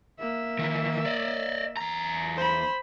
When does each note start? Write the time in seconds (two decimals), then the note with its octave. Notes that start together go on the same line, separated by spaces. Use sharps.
0.20 A#3 E5
0.59 D#3 E3
1.06 D5 D#5
1.77 E2 A#5
2.36 C5 B5